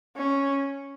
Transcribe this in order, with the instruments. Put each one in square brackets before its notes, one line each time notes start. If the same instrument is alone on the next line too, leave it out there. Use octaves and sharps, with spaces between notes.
[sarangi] C#4